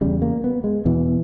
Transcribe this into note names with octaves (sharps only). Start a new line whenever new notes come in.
E2 C#3 G3
A#3
B3
G#3
E2 B2 E3